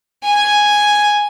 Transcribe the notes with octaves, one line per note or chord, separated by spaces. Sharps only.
G#5